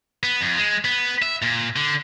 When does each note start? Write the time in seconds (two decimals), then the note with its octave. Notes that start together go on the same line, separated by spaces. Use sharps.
0.23 B3
0.41 F2
0.57 G#3
0.85 B3
1.22 E5
1.42 A#2
1.76 D3